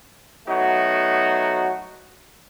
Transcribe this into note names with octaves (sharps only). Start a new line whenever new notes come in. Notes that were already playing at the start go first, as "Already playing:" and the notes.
F#3 A3 B3 D#4 F#4